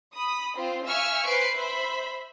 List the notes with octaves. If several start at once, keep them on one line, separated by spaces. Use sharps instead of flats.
B5 D#6
C4 F4 C5
E5 F5 G#5 C#6 E6 F6
B4 C5 C7 D7
C5 E5 B5